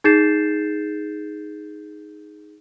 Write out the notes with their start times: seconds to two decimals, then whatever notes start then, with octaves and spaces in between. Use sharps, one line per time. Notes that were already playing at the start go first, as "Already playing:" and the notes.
0.04 D#4 G#4 G6 A6 C7 E7